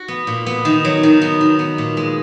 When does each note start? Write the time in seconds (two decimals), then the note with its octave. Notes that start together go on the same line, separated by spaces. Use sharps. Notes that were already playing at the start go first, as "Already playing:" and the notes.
Already playing: F#4
0.08 B3
0.27 A#2
0.46 B3
0.65 D#3
0.85 F#3
1.03 D#3
1.22 B3
1.41 D#3
1.59 B3
1.78 A#2
1.97 G#3